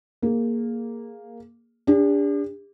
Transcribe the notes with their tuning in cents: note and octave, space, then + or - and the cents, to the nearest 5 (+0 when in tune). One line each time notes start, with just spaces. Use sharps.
A#3 +0 G#4 +0
D4 -20 G4 +45